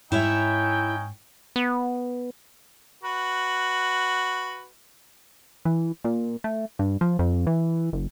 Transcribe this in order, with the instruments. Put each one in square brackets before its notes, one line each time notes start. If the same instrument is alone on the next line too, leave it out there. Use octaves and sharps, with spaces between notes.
[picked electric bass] G#2 [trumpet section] C#4 D#4 G#5 [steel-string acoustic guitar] E4 C#5 E5 [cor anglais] G5
[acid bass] B3
[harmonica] F#4 B4
[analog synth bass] E3
A#2
A3
G2
F3
F2
E3
F#1